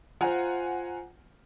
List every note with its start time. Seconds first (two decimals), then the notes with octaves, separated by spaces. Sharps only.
0.21 F4 C5 F#5 G#5 A#5